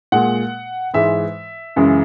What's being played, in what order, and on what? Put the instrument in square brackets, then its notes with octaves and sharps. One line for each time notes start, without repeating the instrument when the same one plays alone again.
[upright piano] A#2 G#3 F#5
G#2 E3 G#3 E5
F#2 C#3 E3 G#3